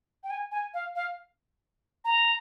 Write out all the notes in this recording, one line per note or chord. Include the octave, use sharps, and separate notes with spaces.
G5
G#5
G#5
F5
F5
A#5